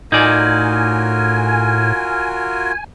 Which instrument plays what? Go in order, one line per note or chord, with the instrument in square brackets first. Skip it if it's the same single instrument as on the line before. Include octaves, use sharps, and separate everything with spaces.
[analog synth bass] A2 [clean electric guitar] D#4 D5 [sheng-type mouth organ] F4 F#4 A#4 [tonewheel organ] G#5